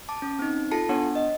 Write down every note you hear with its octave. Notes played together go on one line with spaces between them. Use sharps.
A5 D6
C#4
C4 D#4
F4 A4 A5 C7 C#7
B3 D4 C#5 F#5
D#5